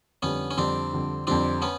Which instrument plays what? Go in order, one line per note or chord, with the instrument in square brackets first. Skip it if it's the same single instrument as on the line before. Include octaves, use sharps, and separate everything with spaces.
[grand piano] F2 D3 G3 [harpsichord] B3 C#4
[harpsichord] C#4
[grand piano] F2 D3 G3 [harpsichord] C4 D4
[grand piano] F2 D3 G3
[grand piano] F2 D3 G3 [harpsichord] C4 D4
[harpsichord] B3 C#4